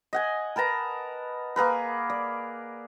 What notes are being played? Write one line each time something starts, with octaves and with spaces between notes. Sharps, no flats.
D#5 F#5 G#5
A#4 B4 A5 A#5
A#3 G#4 A#4 B4
D5